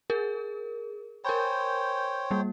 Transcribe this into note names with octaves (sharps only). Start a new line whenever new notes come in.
G#4 A#4
A#4 C5 C#5 G5 G#5 B5
G3 A#3